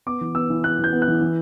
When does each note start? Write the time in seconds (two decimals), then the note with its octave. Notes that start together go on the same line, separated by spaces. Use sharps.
0.06 B3 D6
0.21 E3
0.35 B3 E6
0.50 E3
0.64 B3 F#6
0.79 E3 G6
0.93 B3
1.02 F#6
1.08 E3
1.21 E3